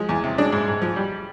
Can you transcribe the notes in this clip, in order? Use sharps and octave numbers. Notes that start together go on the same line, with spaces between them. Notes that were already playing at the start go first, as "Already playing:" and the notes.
Already playing: F3 G#3
E2
C3
G#3 D4
G#2
G#2
F3
G3